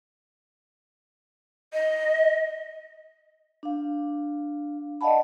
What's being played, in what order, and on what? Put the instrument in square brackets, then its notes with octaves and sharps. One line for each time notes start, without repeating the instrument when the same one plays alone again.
[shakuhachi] D#5
[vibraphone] D4 F5
D5 D#5 F5 F#5 A5 B5